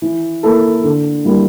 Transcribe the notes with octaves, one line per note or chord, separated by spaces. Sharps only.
E3
A#3 E4 A4
D3
G3 A#3 E4